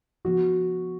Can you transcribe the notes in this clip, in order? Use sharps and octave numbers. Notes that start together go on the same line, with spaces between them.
C#3 F3 B3 F#4